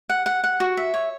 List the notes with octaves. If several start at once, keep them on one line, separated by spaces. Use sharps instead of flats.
F#5
F#5
F#5
F#4
E5
C#5